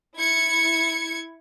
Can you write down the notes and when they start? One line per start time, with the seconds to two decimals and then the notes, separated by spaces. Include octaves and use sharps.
0.16 E4 G#6 C#7